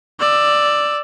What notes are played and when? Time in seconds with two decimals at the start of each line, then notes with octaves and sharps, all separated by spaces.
0.20 D5 E6